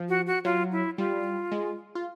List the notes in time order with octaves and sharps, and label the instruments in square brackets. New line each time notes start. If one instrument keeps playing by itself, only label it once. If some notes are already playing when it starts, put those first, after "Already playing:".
Already playing: [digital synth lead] F3
[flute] F#4
F#4
[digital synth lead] F#3 [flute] F4
[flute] E4
[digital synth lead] G3 [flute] F4
[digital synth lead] G#3
F4